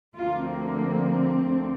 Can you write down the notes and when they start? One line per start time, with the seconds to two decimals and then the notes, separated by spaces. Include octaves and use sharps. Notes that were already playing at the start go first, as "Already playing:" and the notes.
0.17 D2 D3 F3 A#3 F4
0.50 C4
1.45 D2 D3